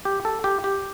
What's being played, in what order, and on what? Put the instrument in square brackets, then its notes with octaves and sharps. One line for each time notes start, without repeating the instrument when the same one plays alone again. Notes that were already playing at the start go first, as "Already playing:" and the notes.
[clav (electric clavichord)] G4
A4
G4
G4